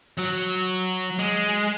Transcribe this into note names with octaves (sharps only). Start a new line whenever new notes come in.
F#3
G#3